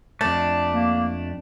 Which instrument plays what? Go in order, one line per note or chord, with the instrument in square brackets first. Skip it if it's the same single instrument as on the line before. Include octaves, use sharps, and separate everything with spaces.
[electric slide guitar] F2 A3 [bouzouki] D4
[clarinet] A#3